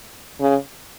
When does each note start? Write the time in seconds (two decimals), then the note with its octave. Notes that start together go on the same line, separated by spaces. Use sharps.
0.41 C#3